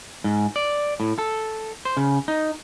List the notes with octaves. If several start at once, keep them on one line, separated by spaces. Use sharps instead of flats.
G#2
D5
A2
A4
C5
C#3
D#4